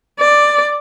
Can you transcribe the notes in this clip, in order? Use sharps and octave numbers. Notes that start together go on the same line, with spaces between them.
D5